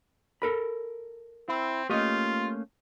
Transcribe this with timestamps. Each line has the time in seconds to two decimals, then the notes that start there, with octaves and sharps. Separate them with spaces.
0.42 A4 A#4 B5
1.48 C4 E4
1.90 A3 A#3 C#4 F4 G4 D#5